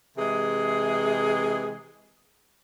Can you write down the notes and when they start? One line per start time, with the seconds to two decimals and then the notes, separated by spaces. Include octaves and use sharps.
0.17 C3 E3 G#3 G#4